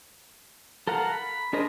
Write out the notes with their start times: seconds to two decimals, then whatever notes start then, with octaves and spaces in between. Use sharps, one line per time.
0.87 A4 A#4 F5 F#5 A#5
1.12 B5
1.53 D4 G#4 A#4 C5 D#5